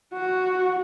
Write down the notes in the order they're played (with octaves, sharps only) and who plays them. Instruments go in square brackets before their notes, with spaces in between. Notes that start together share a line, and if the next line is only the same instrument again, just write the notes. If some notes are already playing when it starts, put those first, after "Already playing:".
[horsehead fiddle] F#4